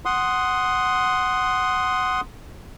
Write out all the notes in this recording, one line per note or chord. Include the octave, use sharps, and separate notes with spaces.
F#5 C6 D#6